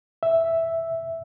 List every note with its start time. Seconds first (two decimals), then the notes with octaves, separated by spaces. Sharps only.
0.23 E5